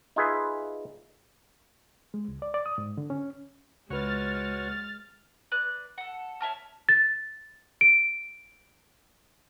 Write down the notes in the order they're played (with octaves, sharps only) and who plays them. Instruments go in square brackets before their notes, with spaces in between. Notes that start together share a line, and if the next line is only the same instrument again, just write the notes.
[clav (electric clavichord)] D#4 F4 G#4 B4 E5
[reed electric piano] G#3
C#2
D5
D5
D#6
G#2
D3
C#4
[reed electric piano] C#2 B4 [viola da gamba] G#3 [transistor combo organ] F#4 C#5 [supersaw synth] F6 A6
[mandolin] B4 D5 F#6
A4 F#5
C#5 E5 A5 F6
[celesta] A6
D7